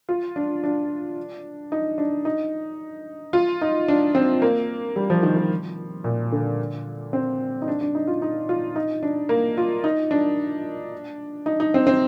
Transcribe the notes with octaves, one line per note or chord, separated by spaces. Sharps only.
F4
D4
D4
D#4
D4
D#4
F4
D#4
D4
C4
A#3
G3
F3
D#3
D#3
A#2
D3
C4
D#4
D4
D4
D#4
F4
D#4
F4
D#4
D4
A#3
F4
D#4
D4
D#4
D#4
C4
C4